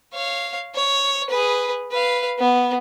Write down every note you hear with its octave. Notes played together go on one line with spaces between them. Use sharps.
C#5 F5
C#5
G#4 B4
B4 F5
B3